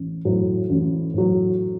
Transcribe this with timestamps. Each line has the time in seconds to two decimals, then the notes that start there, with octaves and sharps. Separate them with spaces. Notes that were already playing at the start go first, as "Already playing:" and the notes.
Already playing: A1
0.25 A2 F#3
0.70 A1
1.14 A2 F#3